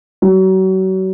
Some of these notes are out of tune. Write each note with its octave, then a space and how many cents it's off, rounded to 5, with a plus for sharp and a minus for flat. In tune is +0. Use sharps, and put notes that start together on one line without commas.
F#3 +35